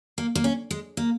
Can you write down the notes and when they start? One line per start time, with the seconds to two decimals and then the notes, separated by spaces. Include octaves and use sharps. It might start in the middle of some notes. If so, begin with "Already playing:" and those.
0.18 A#3
0.35 A#3
0.44 C#4
0.71 G#3
0.97 A#3